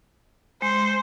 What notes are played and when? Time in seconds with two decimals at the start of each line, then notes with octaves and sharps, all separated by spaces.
0.62 G#3 C5